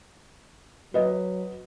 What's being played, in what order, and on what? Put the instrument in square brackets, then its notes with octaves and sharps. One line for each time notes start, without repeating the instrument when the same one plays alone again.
[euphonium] F#3 [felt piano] B4 D#5